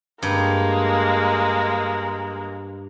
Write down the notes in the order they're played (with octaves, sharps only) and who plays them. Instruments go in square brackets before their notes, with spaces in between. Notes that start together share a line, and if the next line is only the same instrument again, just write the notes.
[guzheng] G2 [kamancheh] G#3 A#3